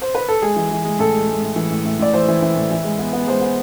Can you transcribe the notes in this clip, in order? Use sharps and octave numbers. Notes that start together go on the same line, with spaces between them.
C5
B4
A4
G#3 G#4
E3
E3
G#3
A2 A4
G#3
G#3
A2
E3
A2
A2
A2 D5
E3 C5
E3
E3
A2
E3
G#3
B3
B3
G#3 C5
B3